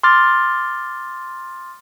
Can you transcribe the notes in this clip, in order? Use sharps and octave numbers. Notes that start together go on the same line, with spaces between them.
C6 D6 F6 A6